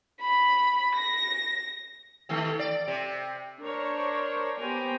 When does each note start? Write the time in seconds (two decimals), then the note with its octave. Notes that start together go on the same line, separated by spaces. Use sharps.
0.21 B5
0.95 A#6
2.29 C3 D#3 A3
2.59 D5
2.88 C3
3.61 D4 A#4 C5 C#5
4.59 B3 G4 C5 G5 G#5 A#5